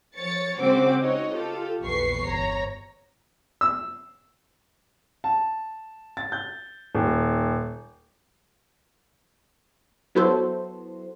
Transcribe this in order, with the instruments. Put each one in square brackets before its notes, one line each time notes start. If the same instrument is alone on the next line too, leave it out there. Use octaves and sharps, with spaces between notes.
[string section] F3 C#5 A6 C#7
C#3 G#3 C4 F#4 C5 D6
D#4 F#4 C#5 D#5
F4 G4 A4
A#1 E2 B4 C#6 C7
G1 C#5 A#5
[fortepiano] E6
[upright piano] A5
A6
G6
D#1
[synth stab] F#3 B3 E4 F#4 A4 C5